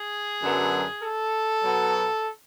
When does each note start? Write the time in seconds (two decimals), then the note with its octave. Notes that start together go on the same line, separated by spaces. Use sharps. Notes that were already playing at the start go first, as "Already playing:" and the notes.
Already playing: G#4
0.42 F#2 D3 F#3 B3
1.02 A4
1.62 B2 F#3 B3